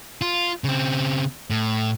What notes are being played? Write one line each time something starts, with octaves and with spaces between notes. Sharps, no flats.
F4
C#3 C4
A2